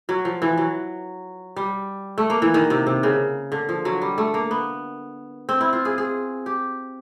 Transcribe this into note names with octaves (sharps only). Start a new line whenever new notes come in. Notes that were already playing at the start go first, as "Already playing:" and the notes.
F#3
F3
E3
F#3
G3
A3
A#3
E3
D#3
C3
C3
C#3
D3
F3
F#3
G3
A3
A#3
B3
C4
E4
F4
G#4
G#4
G4